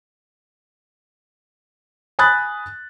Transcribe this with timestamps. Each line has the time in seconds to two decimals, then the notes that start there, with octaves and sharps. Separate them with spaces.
2.19 G#5 B5 D#6 F#6 A6